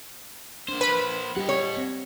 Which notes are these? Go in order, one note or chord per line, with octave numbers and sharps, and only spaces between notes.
A#3 D4 C5
B4 B5
G3 G4 D#5 F#5
C#5
C4